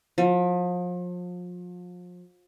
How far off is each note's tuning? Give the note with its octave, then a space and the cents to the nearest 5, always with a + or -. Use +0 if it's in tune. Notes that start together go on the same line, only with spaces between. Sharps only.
F3 +35